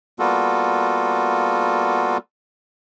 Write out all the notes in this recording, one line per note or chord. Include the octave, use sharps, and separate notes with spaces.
G3 A#3 B3 F4 F#4 A4